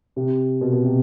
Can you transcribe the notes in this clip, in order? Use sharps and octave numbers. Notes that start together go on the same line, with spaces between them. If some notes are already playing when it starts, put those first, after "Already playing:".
C3
B2
B2
C3